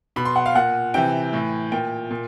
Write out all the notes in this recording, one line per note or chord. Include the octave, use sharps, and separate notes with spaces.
B2 B5
C6
F#5
F5
A#2 F#5
C3 E3 G5
A2 E3
A#2 G5
A#2